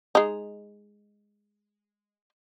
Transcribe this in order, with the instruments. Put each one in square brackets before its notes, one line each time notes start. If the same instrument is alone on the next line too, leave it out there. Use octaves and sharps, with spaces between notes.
[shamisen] G#3 D#4